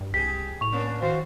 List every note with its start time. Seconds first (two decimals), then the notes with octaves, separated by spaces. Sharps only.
0.01 G2
0.14 C2 G4 G#4 B6
0.61 A2 C#6 F7
0.72 A#3 C#4 D4
1.02 D#3 F#4 C5 F5